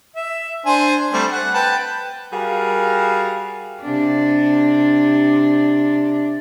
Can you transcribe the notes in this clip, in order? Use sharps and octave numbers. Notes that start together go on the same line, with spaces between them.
E5
D4 C5 G#5
G3 A3 C4
F#5
B4 G5 A5
G3 F#4 G#4 A#4 F5
C3 D4